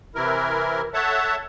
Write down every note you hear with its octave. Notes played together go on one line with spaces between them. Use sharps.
C3 E3 E4 A#4
A4 C#5 E5 F#5 A5